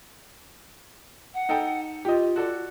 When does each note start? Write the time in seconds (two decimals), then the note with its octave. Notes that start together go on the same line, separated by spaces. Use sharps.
1.34 F#5
1.49 D#4 A4 G5
2.05 F4 G4 D#5
2.36 F#4 A4 D5